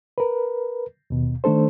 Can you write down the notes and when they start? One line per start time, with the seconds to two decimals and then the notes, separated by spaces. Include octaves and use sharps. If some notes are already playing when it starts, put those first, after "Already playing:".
0.18 A#4 B4
1.10 D#2 B2
1.44 D#3 A3 D4 A4 C5